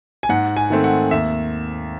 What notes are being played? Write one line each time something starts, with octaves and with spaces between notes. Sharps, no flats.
G#5
G#2 F#5
G#5
D#3 A3 C4
F#5
D#2 E5